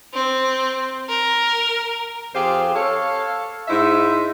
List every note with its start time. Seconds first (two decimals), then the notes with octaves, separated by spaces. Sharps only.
0.14 C4
1.09 A#4
2.34 F2 F4 G4 G#4 C5 F5
2.74 A4 C#5 F5
3.68 G#2 D#4 E4 C5 E5